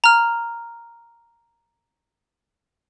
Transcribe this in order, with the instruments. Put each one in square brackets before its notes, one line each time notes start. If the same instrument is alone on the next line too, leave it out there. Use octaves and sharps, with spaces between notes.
[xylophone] A#5 F6